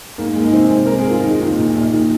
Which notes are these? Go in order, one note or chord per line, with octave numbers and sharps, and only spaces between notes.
G#2 A#3
G#3
D#4
C3 C4
G#3
G#2 A#4
G#4
G#3 F4
D#3 D#4
D#2
A#2
A#1
D#3 D#4